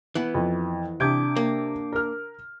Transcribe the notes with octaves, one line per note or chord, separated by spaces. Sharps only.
E3 B3
F2
C3 D4 D6 G6 G#6 D7
A#3
A#4 F6